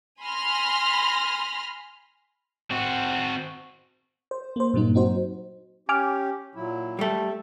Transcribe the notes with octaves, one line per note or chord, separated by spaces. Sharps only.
G#5 B5 C6 F6 A#6
C4 F#4
C5
A#3 C5
G2 A#2 F#3 A#3 D#4
C4 D#4 F#4 C5
C#4 G4 G#5 D6 F6
A#2 F#3 E4
G3 A3 A4 E5